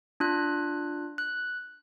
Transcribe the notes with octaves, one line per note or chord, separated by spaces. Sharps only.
D4 F4 F#6
F#6